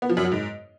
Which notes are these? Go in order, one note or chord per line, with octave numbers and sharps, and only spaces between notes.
B3
F3
F#2
F#3
G#2